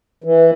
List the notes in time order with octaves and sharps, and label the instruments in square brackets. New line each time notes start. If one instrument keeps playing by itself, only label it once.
[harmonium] E3